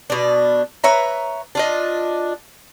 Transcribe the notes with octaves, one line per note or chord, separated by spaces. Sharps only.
B2 D4
B4 C#5 E5 A#5
D4 F4 D#5